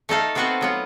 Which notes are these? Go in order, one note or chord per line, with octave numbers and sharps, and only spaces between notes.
A3 D#4 A4 F5
B3 C4 F4 F#4 B4 C5
F#3 B3 F4